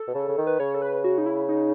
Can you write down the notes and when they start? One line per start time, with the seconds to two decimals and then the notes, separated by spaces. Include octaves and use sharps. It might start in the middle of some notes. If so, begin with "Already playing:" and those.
Already playing: A4
0.08 B2
0.15 C#3
0.28 C#3
0.38 D#3
0.47 B4
0.60 C#3 C#5
0.74 A4
0.82 B4
1.04 F#4
1.18 D#4
1.26 E4
1.49 D#4